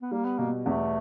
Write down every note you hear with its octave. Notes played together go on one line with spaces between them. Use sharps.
B3
G3 A#3
B3
B2 A#3
E2 A3